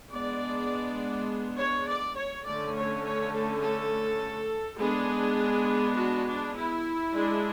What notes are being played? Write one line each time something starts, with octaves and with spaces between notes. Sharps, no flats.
G#3 B3 D4 D5
C#5
D5
C#5
D3 A3 C#4 D5
C#5
C#5
A4
A4
G#3 B3 D4 G#4
F#4
D4
E4
G#3 D4